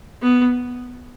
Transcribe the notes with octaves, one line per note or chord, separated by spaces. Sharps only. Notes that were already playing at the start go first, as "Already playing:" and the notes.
B3